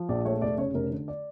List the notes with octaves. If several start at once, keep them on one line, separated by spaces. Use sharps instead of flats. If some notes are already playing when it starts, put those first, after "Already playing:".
Already playing: F3
A#1 D5
A3 C#5
F1 D5
C#3 C#5
F1 A#4
D3
D5